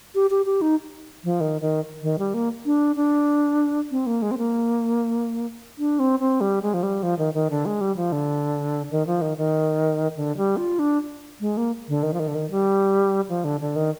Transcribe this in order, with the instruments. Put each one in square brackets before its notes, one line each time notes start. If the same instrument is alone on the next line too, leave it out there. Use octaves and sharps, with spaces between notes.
[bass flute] G4
G4
G4
D#4
F3
D#3
D#3
D#3
G3
A#3
D4
D4
C4
A#3
G#3
C4
A#3
D4
C4
C4
G3
G#3
F3
G3
F3
D#3
D#3
D3
G#3
G3
F3
D3
D#3
F3
D#3
D#3
D3
G3
F4
D4
G#3
A#3
D3
D#3
F3
D#3
D3
D#3
G3
F3
D3
D3
D#3